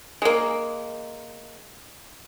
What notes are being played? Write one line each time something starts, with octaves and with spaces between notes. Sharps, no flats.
G#3 A#3